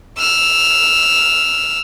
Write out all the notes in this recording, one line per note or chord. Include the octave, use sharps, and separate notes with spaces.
E6 F6